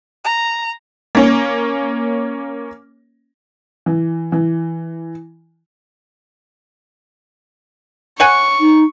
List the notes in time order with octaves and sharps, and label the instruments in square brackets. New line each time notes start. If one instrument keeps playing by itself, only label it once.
[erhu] A#5
[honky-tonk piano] A#3 C#4
E3
E3
[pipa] C#5 F#5 G#5 [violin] C#6
[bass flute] D#4